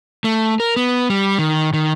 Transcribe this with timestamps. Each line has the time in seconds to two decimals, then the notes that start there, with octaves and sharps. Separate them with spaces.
0.24 A3
0.60 A#4
0.76 B3
1.10 G3
1.39 D#3
1.73 D#3